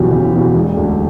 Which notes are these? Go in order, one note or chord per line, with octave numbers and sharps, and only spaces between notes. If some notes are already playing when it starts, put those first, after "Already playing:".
Already playing: F#1 E2 B2 F#3 G4
F#1
E2 B2 F#3
E1
D2 D3